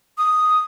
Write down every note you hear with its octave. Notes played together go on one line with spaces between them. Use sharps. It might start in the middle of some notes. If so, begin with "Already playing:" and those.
D#6